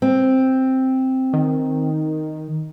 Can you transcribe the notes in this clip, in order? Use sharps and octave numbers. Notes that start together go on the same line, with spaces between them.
C4
D#3